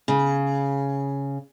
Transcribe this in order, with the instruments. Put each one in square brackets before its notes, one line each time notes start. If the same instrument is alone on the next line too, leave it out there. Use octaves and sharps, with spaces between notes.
[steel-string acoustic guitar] C#3